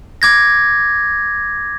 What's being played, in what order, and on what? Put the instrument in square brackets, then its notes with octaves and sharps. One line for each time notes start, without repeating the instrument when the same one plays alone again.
[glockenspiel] D6 G#6 A#6